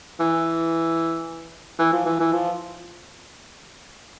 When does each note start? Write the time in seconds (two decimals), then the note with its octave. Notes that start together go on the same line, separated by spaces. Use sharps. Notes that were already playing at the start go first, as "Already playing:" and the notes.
0.20 E3
1.79 E3
1.92 F3
2.06 E3
2.20 E3
2.32 F3